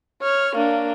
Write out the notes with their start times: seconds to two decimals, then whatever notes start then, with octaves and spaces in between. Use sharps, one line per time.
0.22 C#5 F6
0.55 A#3 D4